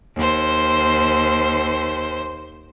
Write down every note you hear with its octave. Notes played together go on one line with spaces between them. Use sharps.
D#2 C5